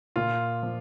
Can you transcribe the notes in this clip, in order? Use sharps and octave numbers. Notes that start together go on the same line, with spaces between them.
A#2 F4
F3